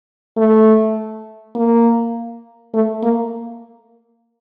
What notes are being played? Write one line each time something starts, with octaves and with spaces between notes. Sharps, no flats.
A3
A#3
A3
A#3